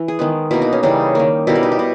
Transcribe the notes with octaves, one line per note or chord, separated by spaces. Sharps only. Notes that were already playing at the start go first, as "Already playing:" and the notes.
Already playing: E3 E4
G#4
D#3 G#3 B3
B2 A#3 E4
D#4
C#4
C#3 E3 G3 D#4
D#3 A#3
B2 G3 A#3 E4
G4
D#4
E4
B2